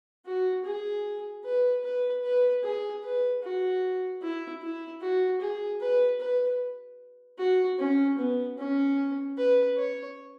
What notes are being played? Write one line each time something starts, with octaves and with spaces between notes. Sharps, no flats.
F#4
G#4
B4
B4
B4
G#4
B4
F#4
E4
E4
F#4
G#4
B4
B4
F#4
C#4
B3
C#4
B4
C#5